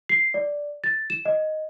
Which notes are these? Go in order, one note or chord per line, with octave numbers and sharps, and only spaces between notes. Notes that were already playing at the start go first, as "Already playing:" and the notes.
C7
D5
A6
E7
D#5